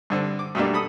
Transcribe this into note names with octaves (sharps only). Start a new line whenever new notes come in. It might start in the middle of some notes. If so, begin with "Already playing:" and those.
G2 D3 C4
D6
G2 B2 A3 A#3 D4
A4 B5 D#6